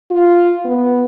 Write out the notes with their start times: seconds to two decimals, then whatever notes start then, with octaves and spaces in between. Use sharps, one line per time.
0.11 F4
0.65 B3